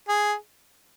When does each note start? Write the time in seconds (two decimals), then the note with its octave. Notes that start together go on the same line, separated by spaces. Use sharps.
0.09 G#4